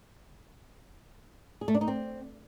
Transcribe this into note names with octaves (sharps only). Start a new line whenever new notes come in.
G#4
A3
D4
D#4
C4